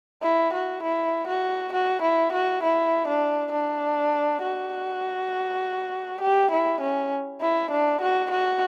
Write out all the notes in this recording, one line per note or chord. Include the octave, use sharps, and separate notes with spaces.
E4
F#4
E4
F#4
F#4
E4
F#4
E4
D4
D4
F#4
G4
E4
C#4
E4
D4
F#4
F#4